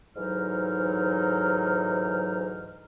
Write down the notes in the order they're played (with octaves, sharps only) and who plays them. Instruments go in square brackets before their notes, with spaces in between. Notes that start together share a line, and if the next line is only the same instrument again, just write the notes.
[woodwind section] D2 G#2 E3 F#3 D#4 F6